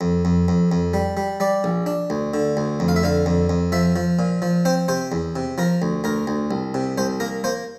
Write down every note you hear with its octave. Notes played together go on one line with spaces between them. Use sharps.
F2
F2
F2
F2
G3
G3
G3 D5
A#1
D4
D2
D3
D2
F2
F5
E5
D3 F5
F2
F2
F3 E5
F3
A#2
F3
C4 C5
C3 C5
E2
C3
F3 A#4
D2
D2 A#4
D2
C2
C3
C2 C5
A#3 A#4
A#3 C5